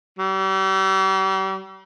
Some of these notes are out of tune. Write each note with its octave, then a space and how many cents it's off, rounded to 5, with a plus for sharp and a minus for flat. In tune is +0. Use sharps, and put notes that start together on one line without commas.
G3 -40